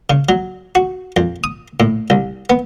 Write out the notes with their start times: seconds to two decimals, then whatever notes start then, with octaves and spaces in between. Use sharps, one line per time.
0.10 C#3
0.29 F#3
0.75 F#4
1.17 F2
1.44 D#6
1.80 A2
2.10 C2
2.50 B3